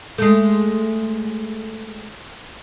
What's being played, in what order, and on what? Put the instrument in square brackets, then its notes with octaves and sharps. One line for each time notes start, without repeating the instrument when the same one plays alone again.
[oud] G#3 A3